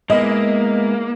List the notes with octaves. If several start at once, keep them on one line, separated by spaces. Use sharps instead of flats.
G#3 A#3 B3 E4 D#5